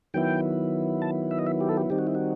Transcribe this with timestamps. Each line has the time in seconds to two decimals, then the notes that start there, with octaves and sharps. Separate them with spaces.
0.14 D#3 F#3 B3 E4 G5
1.02 A5
1.31 E5
1.39 D#5
1.47 E5
1.60 G4
1.69 A4
1.77 G4
1.90 D#3 G3 C4 D#4 G4
1.99 F#4
2.07 E4
2.15 F#4